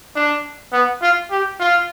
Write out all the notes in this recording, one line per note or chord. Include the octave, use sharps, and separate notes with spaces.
D4
B3
F4
G4
F4